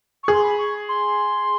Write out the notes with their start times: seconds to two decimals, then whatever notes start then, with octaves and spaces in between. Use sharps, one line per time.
0.23 C#6
0.28 G#4 C6
0.43 B5
0.58 C#6
0.88 C6